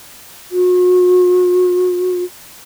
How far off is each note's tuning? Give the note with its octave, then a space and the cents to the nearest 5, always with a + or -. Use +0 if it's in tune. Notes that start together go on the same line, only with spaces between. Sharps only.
F#4 -40